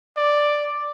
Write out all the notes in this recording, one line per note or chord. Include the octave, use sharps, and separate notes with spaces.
D5